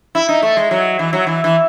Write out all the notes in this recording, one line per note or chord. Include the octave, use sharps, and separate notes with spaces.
E4
D#4
A3
G#3
F#3
E3
F#3
E3
E3